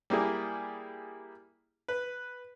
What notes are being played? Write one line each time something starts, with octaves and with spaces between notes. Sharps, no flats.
G3 A#3 E4 G#4
B4